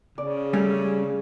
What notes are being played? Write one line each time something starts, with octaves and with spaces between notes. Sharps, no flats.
C#3 D5
G3 A3 C#4